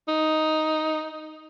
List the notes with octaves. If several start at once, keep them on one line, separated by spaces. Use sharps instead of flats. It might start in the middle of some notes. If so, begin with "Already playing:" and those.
D#4